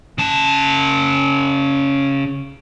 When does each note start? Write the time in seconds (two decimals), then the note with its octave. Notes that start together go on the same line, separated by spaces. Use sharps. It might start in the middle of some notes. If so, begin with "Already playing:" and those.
0.18 C#3 A5